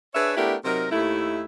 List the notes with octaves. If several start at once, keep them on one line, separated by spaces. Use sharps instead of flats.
D4 G#4 B4 C#5 E5
A3 B3 D4 E4 G4 A#4
C3 F#3 D#4 A#4
D#2 A3 E4